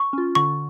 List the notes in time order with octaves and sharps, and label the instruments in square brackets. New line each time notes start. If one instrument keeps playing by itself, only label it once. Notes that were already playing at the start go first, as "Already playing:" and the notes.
Already playing: [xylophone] C#6
[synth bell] C#4 F4
[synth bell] D3 [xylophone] C#6